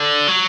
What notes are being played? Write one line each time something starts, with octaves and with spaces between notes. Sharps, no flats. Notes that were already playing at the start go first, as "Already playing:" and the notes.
Already playing: D3
F#3